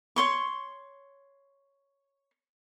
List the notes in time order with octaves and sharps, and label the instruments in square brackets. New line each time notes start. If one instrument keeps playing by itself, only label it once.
[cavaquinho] C#5 C6 C#6